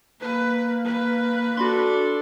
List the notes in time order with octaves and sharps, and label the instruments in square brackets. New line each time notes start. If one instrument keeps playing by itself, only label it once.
[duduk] A#3 [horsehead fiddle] B4
[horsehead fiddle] B4
[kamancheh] D4 A4 [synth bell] F#4 B5 C6